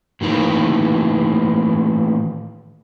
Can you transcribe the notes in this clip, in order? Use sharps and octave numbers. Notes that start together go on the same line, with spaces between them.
A2 D#3 E3 A#3